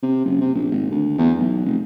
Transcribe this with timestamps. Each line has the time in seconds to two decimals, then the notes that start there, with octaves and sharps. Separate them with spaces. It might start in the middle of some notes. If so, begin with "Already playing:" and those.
0.03 C3
0.25 F#1
0.41 C3
0.55 A#1
0.71 G#1
0.91 D2
1.18 E2
1.39 B1
1.65 F1